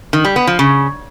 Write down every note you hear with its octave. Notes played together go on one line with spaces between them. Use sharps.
D#3
G3
B3
F3
C#3